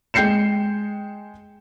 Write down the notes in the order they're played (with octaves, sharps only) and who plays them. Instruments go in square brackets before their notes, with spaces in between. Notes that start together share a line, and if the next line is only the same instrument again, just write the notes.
[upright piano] G#3 G5 G6 C7 C#7 E7